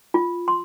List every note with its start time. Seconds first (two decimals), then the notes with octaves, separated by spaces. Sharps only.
0.14 F4
0.48 C6